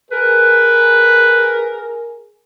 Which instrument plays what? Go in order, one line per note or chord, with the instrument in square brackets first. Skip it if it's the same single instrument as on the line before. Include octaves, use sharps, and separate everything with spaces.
[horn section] G#4 A#4 [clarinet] B4